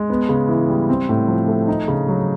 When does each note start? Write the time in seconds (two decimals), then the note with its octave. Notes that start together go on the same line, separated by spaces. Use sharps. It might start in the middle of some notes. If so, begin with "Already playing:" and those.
Already playing: G#3
0.10 B3
0.29 C#3
0.48 E3
0.69 G3
0.89 C4
1.09 A2
1.28 F3
1.48 A3
1.68 D#4
1.88 C#3
2.08 F#3